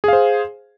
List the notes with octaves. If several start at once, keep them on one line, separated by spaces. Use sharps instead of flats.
G#4 C5 F5